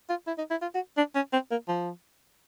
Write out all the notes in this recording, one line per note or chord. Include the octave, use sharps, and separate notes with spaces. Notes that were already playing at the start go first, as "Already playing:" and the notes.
F4
E4
D#4
E4
F4
F#4
D4
C#4
C4
A#3
F3